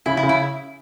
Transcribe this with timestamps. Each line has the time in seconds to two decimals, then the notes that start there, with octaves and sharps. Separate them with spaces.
0.06 C#3 E4
0.17 E4
0.23 C#3
0.29 E4